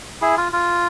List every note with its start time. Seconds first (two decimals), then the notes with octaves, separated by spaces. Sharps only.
0.22 E4 G#4
0.37 F4
0.52 F4